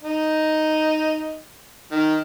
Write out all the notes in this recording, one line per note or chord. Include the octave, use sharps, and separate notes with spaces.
D#4
D#3